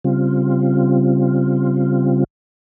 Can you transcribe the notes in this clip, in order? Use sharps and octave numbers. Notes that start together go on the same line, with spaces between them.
C#3 G3 C4 F4